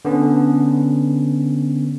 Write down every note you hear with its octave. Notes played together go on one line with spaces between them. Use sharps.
D3 B3 C#4